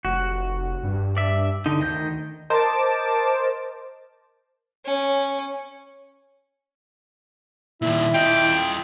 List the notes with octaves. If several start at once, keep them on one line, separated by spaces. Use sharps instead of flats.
F1 F#4
G2
D5 E5
D3 D#4
D2 D#3 D#5 G6
A#4 C5 D#5 A5 D6
C#4
A#2 D#3 E4
F4 D#5 G5